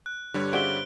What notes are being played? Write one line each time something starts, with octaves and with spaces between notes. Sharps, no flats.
F#6
G2 D3 G3 C#5
C#3 C4 F#4 D5 E5 D7 G7